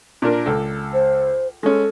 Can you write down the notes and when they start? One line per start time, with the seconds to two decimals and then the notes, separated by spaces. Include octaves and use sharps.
0.22 A#2 D4 A#4
0.46 C#2 A4
0.94 C5
1.63 G#3 C#4 A4